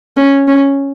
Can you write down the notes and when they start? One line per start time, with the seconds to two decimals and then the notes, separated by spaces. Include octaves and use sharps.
0.17 C#4
0.48 C#4